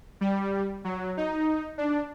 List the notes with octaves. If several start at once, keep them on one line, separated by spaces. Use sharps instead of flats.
G3
F#3
D#4
D4